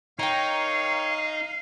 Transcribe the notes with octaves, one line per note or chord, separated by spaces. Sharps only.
D#4 A#4 C#5 F5 G5